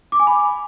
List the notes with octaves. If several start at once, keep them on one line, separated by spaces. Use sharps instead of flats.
D6
G#5
B5